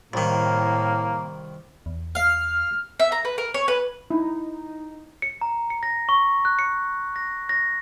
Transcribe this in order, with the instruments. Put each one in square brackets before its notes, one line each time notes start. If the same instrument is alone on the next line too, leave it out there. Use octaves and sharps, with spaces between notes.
[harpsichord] C2 D#3 [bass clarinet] A2 [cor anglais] A#3
[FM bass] E2
[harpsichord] F5 [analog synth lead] F6
[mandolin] E5
A#5
B4
A#4
C#5
B4
[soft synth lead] D#4 [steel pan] E4
[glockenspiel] C#7
A#5
C#7
A#6
C#6
F#6
C#7
A#6
A#6